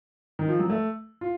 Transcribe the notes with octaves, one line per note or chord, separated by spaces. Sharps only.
D#3
F3
F#3
A3
F4